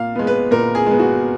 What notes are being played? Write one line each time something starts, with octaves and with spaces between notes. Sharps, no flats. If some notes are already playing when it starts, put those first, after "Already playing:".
Already playing: A#2 F5
G#3 B3
B4
A#2 A#4
G#4
G#3 B3
F#4